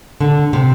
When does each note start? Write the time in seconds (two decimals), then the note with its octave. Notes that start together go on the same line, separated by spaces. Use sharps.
0.21 D3
0.53 C3